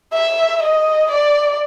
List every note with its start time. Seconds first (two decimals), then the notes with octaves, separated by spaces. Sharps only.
0.13 E5
0.63 D#5
1.11 D5